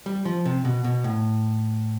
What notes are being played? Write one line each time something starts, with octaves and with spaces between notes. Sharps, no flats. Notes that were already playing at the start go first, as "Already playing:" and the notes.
G3
F3
C3
B2
B2
A2